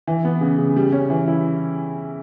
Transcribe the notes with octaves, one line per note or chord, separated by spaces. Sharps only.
E3
B3
C#3
C#3
G3
C#4
E3
E4